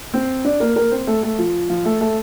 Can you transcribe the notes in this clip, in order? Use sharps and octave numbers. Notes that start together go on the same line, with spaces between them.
C4 C5
D4 D5
A#3 A#4
A#3 A#4
C4 C5
A3 A4
A3 A4
F3 F4
F3 F4
A3 A4
A3 A4